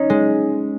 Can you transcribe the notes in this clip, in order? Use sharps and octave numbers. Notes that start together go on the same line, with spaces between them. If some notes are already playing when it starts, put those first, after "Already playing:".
Already playing: C#4 D#4
G#3